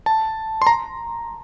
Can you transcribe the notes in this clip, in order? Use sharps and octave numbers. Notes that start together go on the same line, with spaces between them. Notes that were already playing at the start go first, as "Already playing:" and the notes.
A5
C6
A#5